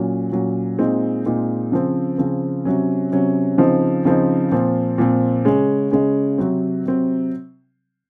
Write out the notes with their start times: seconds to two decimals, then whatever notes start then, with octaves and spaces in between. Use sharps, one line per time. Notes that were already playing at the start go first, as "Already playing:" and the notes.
Already playing: A#2 F#3 C#4
0.32 A#2 F#3 C#4
0.78 A#2 G#3 C4 D#4
1.25 A#2 G#3 C4 D#4
1.72 C#3 F3 C4
2.18 C#3 F3 C4
2.65 C3 F#3 C#4
3.12 C3 F#3 C#4
3.58 C#3 F3 C4 D#4
4.05 C#3 F3 C4 D#4
4.52 A#2 F3 C4
4.98 A#2 F3 C4
5.45 C#3 G#3 C#4
5.91 C#3 G#3 C#4
6.38 C3 F#3 C4
6.85 C3 F#3 C4